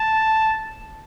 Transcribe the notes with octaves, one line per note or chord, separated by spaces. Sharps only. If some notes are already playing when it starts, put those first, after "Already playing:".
Already playing: A5